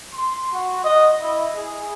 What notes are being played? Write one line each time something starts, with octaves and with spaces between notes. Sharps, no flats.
C6
F#4
D#5
E4
G#4